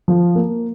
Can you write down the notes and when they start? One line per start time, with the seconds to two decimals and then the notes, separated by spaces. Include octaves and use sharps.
0.08 F3
0.35 A#3